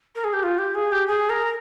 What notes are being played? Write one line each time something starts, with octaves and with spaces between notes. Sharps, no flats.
A#4
G#4
G4
F4
G4
G#4
G4
G#4
A#4